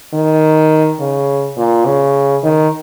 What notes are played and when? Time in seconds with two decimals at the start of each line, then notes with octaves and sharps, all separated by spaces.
0.13 D#3
1.00 C#3
1.57 A#2
1.86 C#3
2.43 D#3